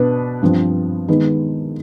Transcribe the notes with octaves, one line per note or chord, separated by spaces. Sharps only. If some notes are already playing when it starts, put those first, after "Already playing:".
Already playing: B2 B3 D4 B4
G2 F3 C4
D#3 G#3 B3 D#4 B4